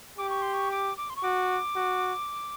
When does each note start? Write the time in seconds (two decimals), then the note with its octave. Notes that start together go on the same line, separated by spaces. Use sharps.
0.18 G4 D6
0.30 C#6
0.42 C6
0.54 C#6
0.71 D6
0.98 D6
1.10 C6
1.16 C#6
1.23 F#4 D6
1.76 F#4